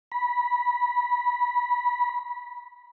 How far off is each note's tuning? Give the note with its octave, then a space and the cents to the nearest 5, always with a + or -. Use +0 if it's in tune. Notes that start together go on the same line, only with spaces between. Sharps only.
B5 -20